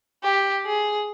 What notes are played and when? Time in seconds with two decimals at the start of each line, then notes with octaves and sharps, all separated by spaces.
0.23 G4
0.66 G#4